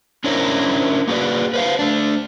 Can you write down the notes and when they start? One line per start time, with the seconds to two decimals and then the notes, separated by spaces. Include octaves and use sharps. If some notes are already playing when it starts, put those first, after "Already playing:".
0.24 C#4 D4 E4 A#4 C5 C#5
1.08 A#3 F#4 G#4 B4 D5
1.54 B4 C5 F5
1.79 A3 D4